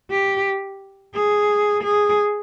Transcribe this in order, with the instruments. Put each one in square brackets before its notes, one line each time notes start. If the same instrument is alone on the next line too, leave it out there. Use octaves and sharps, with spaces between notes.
[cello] G4
G#4
G#4